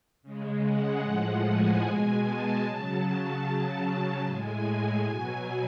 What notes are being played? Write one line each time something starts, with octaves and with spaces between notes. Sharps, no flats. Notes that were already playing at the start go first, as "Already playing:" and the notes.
C#3 G#3
F#5
A2 F3 G#3
G#5
B2 G#3
A5
C#3 F#3 A5
C#3 F#3
A2 G#3 G#5
B2 F#3